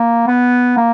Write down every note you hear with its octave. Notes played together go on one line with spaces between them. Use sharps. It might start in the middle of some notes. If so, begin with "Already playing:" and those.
Already playing: A#3
B3
A#3